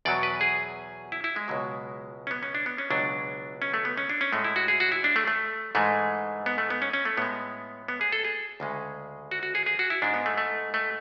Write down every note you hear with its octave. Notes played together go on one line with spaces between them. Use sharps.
E2 B2 F#3 D5
B4
G#4
E4
E4
G#3
C#2 B2 F#3
C#4
B3
C#4
D4
B3
C#4
C#2 B2 F#3 D4
C#4
A3
B3
C#4
D4
C#4
A2 G#3 A3
E4
F#4
G#4
F#4
E4
D4
A3
A3
G#2 E3 G#3 A3
B3
A3
B3
C#4
C#4
A3
A2 G#3 B3
B3
G#4
A4
G#4
D2 C#3 G#3
F#4
F#4
G#4
G#4
F#4
E4
G#2 G#3 D4
B3
A3
A3
A3